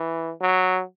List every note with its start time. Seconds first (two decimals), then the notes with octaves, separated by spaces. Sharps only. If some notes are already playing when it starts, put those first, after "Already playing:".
Already playing: E3
0.41 F#3